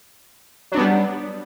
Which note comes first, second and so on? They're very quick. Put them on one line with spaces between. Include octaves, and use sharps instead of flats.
F#3 D4 B3 G3